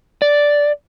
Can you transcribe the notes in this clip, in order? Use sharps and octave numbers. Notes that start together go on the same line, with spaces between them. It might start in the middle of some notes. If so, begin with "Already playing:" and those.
D5